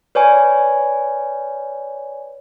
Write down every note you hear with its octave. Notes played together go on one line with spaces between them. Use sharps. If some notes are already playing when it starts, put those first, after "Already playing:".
B4 C#5 D5 G#5